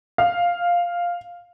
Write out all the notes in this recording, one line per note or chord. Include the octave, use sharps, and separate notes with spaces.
F5